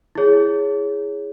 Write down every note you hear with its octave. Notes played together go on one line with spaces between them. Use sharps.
E4 G#4 C#5